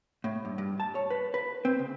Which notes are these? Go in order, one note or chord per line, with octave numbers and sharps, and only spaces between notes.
A2
G2
G2
A5
C#5
B4
B4
C4
C#3